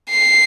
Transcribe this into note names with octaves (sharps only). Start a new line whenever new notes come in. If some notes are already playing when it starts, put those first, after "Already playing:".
C7